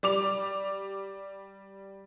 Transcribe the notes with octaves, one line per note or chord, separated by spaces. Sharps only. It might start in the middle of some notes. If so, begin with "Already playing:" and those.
G3 D6 F7